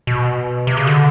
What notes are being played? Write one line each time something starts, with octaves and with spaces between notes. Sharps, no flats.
B2
C3
C#3
D3